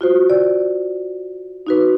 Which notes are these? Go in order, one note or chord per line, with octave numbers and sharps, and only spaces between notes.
F4 F#4 C5
D5
D#4 F#4 B4